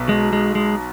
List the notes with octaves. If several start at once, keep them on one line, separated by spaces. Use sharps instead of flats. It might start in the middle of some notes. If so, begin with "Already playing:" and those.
Already playing: B1 B2
G#3
G#3
G#3